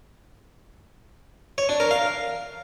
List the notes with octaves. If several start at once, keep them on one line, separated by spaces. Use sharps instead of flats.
C#5
D4
A#4
F5